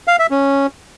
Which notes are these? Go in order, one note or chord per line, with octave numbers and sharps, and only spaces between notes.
F5
E5
C#4